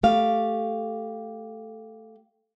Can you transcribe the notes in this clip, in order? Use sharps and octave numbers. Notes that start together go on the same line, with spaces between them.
A3 G4 F5